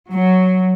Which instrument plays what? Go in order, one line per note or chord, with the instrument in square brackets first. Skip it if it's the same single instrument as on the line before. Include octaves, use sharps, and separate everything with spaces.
[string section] F#3